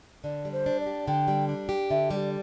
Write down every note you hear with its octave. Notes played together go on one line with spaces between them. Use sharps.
D3 D5
G3
C5
D4
D5
G4
D3 G5
G3
D4
G4
D3 E5
G3 D5